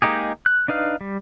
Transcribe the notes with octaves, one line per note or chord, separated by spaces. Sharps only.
G#3 A#3 D#4 G4 G#4
F#6
D4 D#4 B4 F5
G3